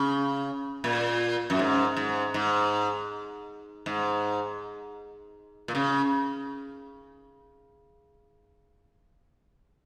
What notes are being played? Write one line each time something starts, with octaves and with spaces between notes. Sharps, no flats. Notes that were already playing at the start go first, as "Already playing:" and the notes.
Already playing: C#3
A#2
F#2
G#2
G#2
G#2
G#2
A#2
C#3